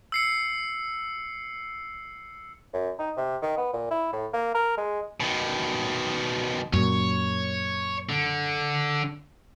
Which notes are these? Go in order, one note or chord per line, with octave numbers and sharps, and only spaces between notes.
E6 C7 C#7
F#2
D#4
C3
D#3
B3
A#2
E4
A2
A#3
A#4
G#3
B2 D#3
F#2 A#2 C#5
D3